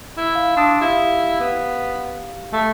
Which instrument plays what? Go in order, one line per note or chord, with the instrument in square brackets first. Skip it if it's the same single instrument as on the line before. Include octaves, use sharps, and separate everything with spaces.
[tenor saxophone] E4
[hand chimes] F5
[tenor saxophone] D4 [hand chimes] C6 D#6 E6
[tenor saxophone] E4 [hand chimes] G4 F5
[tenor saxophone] B3
A3